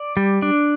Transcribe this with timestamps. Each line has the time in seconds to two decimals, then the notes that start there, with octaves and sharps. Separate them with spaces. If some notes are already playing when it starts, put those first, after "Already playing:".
Already playing: D5
0.17 G3
0.42 D4